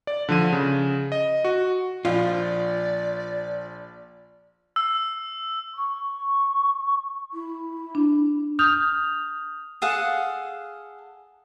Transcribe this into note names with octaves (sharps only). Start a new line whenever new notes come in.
D5
D3 F3 D#7
C#3
D#5
F#4
A#1 F3 F4 D5
E6
C#6
E4
D4
D#6 F6 G6 F7
G#4 A4 F5 F#5